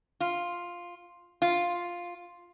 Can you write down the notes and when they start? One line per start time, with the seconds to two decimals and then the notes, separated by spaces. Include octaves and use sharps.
0.20 F4
1.42 F4